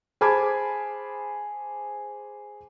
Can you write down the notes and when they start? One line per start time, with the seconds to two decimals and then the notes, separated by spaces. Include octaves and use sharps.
0.21 G#4 C5 A5 B5 D6 G#6